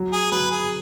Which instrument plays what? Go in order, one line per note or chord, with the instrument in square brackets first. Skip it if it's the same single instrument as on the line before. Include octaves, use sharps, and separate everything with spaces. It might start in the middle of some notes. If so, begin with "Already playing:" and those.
Already playing: [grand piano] F#3
[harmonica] G#4
[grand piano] F#3 [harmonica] B4
[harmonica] G#4